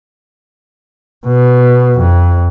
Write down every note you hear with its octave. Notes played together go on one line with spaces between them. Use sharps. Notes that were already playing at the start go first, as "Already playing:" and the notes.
B2
F2